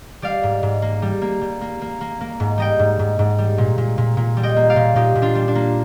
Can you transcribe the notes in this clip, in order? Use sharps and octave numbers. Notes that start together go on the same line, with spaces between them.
G3 D5 F5
G#2
G#2
A#3
G3
A#3
G3
A#3
A#3
A#3
A#3
G#2
G3 D#5 G5
G#2
G#2
G#2
G3
A#2
A#2
A#2
A#2
G3
D#5 G5
A#3
D5 F5
A#2
A#2 D#4 G4
A#2
D4 F4
G3
D4
A#3